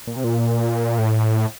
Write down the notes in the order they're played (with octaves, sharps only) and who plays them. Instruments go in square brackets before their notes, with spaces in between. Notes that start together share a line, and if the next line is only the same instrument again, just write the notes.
[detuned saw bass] A#2
C3
A#2
A2